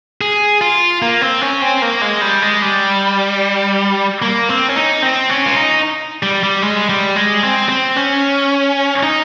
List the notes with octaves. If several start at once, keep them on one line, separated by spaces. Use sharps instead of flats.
G#4
F4
A#3
C4
C#4
C4
A#3
G#3
G3
G#3
G3
A#3
C4
C#4
D#4
C4
C#4
F4
D#4
G3
G3
G#3
G3
G#3
C4
C4
C#4
D#4